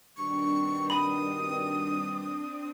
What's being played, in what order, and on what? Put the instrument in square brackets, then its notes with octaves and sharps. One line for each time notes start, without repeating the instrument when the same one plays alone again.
[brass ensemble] G2 B2 D#3 [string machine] C4 D4 [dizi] C#6
[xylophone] B5 [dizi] D#6